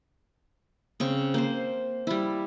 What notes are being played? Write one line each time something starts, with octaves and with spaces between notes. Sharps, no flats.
C#3 C4 C#6
A#3 C5
G3 E4